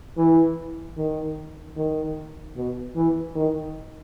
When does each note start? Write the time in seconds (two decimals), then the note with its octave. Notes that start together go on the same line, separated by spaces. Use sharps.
0.18 E3
0.97 D#3
1.77 D#3
2.56 B2
2.96 E3
3.36 D#3